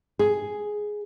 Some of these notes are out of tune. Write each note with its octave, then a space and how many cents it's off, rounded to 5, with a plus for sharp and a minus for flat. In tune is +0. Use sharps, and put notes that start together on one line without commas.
G#4 +5